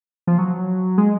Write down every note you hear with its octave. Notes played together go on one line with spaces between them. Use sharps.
F3
F#3
G#3